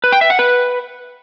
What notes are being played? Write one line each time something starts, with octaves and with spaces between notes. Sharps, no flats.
B4
G5
E5
F#5
B4